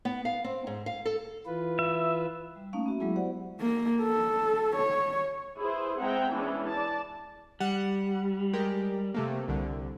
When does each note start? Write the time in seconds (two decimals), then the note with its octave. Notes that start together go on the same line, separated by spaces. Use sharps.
0.05 B3
0.25 F5
0.44 C4
0.67 G#2
0.86 F5
1.05 A4
1.46 E3 F4 B4
1.79 E5
2.56 G3
2.73 A3 A#3 C#4 D#4 F5
2.86 B3 F#4 E5
3.00 F#3 G#3 B3 E4 G#4
3.16 F#4 G4 C5 D5 F#5
3.61 A#3
4.02 A4
4.76 C#5
5.58 E4 G#4 B4 C5
6.00 G#3 C4 E5 F#5 G5 A#5
6.32 E3 G#3 B3 C#4 D4 E4
6.68 D5 A5
7.60 G3 F#5
8.53 G#3 G4 A#4
9.14 C3 A3 A#3
9.48 C2 D3